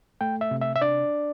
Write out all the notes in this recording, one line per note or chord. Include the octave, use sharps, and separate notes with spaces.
A3 G5
E5
C3
E5
E5
D4 D5